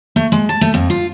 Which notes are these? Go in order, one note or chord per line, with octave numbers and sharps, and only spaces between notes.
A3
G#3
A5
A3
F2
F4